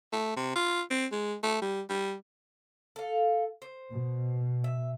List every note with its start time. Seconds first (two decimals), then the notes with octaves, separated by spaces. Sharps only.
0.12 A3
0.36 C3
0.56 F4
0.90 C4
1.11 G#3
1.43 A3
1.61 G3
1.89 G3
2.96 A4 F5
3.62 C5
3.90 B2
4.64 E5